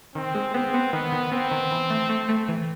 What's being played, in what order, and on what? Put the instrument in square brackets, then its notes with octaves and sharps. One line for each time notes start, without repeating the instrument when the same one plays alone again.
[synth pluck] D#3 [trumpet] C4
[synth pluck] G#3
[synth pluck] B3 [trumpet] C4
[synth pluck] B3
[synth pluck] D#3 [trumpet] B3
[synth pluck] D#3
[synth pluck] B3 [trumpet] C4
[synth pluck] D#3
E3
A3
A3
A3
E3